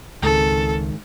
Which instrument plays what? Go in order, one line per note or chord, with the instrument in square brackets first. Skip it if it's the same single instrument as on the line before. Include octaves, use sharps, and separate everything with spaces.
[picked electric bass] C#2 [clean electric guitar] G#2 D#3 [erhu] A4